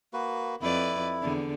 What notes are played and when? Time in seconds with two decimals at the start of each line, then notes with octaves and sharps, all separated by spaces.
0.13 A#3 F#4 B4
0.62 F2 E4 B4 D5
1.22 E2 D3